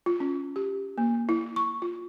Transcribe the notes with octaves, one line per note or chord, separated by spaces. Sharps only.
F4
C#4
G4
A#3
E4
C#6
F4